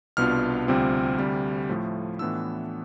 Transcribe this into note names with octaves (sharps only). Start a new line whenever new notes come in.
C2 B2 B3 D4 F4 F6
D2 C3 G3 C4 F4
D2 C3 G3
A2 F3 A3
A2 E3 B3 D4 F4 E6